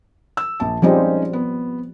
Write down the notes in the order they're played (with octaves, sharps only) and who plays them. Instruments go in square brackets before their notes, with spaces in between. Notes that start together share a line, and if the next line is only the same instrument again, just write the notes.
[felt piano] E6
A#1 A5
[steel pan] F3 G3 C4 [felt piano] G#3 C#4 D#4
[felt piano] B3